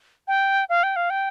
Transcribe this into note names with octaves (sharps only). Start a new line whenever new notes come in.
G5
F5
G5
F5
G5